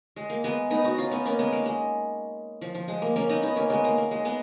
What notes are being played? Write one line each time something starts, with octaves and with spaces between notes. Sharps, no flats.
G#3
A#3
G#3 B3
B3 D#4
D#4 F#4
C#4 F4
B3 D#4
A#3 C#4
G#3 B3
A#3
G#3
F3
F3
G#3
A#3
A#3 C#4
B3 D#4
B3 D#4
A#3 C#4
G#3 B3
A#3
A#3
G#3
G#3 B3